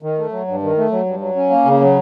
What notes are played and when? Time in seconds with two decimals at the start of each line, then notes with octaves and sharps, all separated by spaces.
0.02 D#3
0.18 A3
0.32 F#3
0.48 G2
0.63 D#3
0.77 A3
0.91 F#3
1.06 G2
1.21 F#3
1.36 C#4
1.50 A#3
1.65 C#3
1.81 F#3